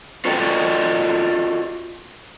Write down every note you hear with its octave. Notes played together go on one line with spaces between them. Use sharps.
F4 F#4 A4 D5 D#5 G5